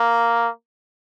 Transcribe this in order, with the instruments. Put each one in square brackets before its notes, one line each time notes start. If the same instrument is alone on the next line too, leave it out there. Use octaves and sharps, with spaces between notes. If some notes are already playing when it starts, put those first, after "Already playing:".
Already playing: [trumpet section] A#3